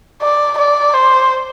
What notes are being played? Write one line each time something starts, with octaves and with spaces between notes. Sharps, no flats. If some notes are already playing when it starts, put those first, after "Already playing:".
D5
D5
C5